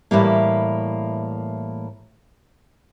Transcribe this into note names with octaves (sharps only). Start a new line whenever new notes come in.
A2 E3 G3 A#3